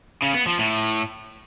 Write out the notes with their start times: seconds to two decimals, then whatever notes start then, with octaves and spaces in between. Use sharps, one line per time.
0.22 C#3
0.34 B3
0.46 F3
0.58 A2